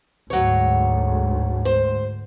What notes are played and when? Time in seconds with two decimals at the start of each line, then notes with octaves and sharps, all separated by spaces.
0.30 D2 G#2 F#3 C#5
1.65 C5